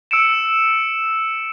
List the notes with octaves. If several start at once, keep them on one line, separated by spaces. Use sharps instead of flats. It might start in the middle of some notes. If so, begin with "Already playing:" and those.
E6 C#7 D7 E7